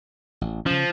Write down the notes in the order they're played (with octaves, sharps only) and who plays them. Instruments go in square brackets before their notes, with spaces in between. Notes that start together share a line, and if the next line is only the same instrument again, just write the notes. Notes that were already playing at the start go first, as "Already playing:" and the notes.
[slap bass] A1
[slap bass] C#3 C#4 [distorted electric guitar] F3